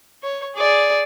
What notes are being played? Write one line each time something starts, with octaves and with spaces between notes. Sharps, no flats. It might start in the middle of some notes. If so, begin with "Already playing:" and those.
C#5
G#4 D5